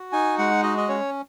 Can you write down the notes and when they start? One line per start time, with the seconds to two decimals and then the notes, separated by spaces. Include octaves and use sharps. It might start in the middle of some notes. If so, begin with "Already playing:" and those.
Already playing: F#4
0.12 D#4 G#5
0.38 G#3 F#5
0.63 F#4 D#5
0.77 D#5
0.89 C#4 C#5